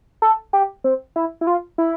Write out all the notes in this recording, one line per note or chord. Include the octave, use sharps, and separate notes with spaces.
A4
G4
C4
E4
E4
F4
E4